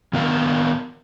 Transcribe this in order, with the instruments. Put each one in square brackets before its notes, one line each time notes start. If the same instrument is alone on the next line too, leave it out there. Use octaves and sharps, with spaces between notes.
[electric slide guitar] D#3 B3 A#4 F5